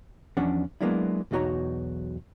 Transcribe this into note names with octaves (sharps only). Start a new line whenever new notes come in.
E2 F3 C#4 D4 F#5
F#3 G#3 A#3 B3 D4 E4
B1 E2 D#4 F#4 C#5 A#5